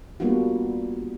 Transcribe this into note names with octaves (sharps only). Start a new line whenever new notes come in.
G3 A#3 B3 D4 F4 F#4